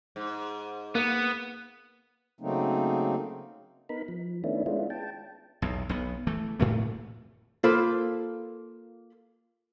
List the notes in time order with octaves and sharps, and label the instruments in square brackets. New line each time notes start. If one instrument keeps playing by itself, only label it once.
[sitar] G#2
[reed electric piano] A#3 [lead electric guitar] B3
[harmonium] C#3 F#3 A3 A#3 C4 D#4
[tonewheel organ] B3 D#4 A#4 B5
F3
D#3 A3 B3 C#4 D4 E4
G#3 B3 C#4 D4 E4 F4
G5 A5
[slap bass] B1 E2
B1 B3
E3 A3
A2 A3 A#3
[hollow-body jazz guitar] A#3 F4 A4 C5 B5